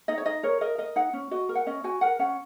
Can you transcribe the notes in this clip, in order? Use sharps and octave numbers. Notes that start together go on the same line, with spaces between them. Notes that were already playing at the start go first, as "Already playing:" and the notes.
D#4 D#5
C#5
D#4 D#5
A#4 C#5
A#4 D#5
A#4 D#5
D#4 F#5
C#4
F#4 D#5
A#4
F#5
C#4 D#5
F#4 G#5
A#4 F#5
C#4 F#5